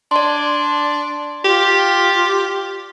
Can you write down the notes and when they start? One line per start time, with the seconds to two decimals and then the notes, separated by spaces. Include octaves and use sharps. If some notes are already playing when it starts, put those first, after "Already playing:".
0.11 D4 D5 C6
1.45 F4 G4